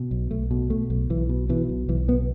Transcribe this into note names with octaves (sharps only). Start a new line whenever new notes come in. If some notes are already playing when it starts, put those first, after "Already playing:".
Already playing: B2
B1
B1 A3
B2
B2 A3
B1
B1 E3
B2
B2 E3
B1
B1 E3
B2 B3